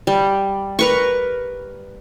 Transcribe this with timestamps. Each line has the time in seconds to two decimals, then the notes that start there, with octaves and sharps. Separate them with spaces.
0.07 G3
0.79 A#4 B4 C#6